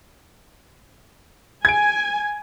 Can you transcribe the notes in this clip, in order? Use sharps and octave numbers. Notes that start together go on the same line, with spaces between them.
G#5 G#6 D7